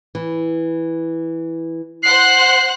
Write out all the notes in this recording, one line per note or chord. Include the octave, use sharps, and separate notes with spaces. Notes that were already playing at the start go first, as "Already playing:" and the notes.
E3
C5 F#5 F#6 C7